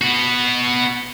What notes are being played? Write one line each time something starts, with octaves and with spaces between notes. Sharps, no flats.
B3 F#4